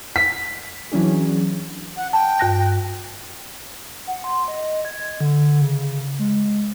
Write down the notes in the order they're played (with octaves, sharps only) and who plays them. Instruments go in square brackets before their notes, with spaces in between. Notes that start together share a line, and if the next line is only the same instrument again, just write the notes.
[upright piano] B6
[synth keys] E3 F#3 C#4 D4 G#4
[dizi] F#5
[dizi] G5 [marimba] A5
[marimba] G2 F#6 A#6
[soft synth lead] F#5
C6
D#5
G#6
D3
C#3
G#3